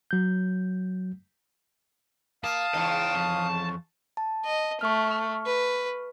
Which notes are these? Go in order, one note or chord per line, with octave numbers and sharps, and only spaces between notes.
F#3 G6
A#3 F5 A5 D#6
E2 G#2 C#3 D#5 G5
F2
A5
D#5
A3 C#6 F6
B4